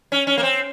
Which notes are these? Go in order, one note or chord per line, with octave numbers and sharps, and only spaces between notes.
C#4
C#4
A#3
C4